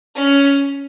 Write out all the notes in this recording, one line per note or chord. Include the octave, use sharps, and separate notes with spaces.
C#4